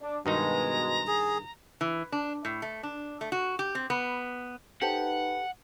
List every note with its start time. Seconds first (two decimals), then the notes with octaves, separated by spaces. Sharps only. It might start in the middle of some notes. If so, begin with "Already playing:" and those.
0.02 D4
0.26 G2 B2 D#3 G#3 D#4 A#5
1.07 G#4
1.81 E3
2.12 D4
2.45 A2
2.62 A3
2.83 D4
3.21 A3
3.32 F#4
3.59 G4
3.75 C4
3.90 B3
4.82 D#4 G4 A4 B4 C5 F#5